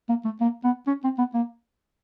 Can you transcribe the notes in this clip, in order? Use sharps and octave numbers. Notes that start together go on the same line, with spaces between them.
A#3
A3
A#3
B3
C#4
C4
B3
A#3